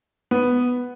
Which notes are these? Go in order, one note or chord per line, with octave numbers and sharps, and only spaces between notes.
B3